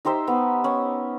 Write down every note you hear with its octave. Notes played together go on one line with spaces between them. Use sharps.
D#4 G4 C5 E5
B3
C#4